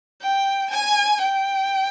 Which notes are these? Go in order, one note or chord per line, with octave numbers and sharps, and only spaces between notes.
G5
G#5
G5